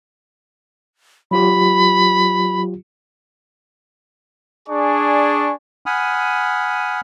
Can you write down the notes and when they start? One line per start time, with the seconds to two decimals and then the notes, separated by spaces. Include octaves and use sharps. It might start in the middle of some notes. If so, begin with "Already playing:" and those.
1.31 F#3 F4 G4 B5
4.69 D4 G#4 D5 G#5 C#6
5.86 F#5 G#5 B5 D#6 F6